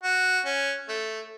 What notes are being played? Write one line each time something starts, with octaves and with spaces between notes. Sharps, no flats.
F#4
C#4
A3